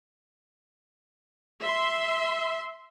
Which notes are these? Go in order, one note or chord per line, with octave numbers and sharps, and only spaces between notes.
E5 C6